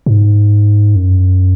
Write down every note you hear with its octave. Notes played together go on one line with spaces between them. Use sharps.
A#2
G#2
F#2